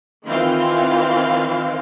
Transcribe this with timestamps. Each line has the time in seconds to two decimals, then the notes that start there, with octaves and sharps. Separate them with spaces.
0.24 D#3 E3 C4 F4 F5 C6